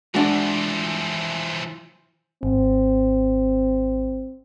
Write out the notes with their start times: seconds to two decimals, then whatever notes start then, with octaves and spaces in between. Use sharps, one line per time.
0.15 E3 F3 G#3 D4 F#4
2.43 G#1 C4